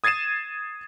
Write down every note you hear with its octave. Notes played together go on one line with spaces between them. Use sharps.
D#6 G#6 A6 C7 D#7 E7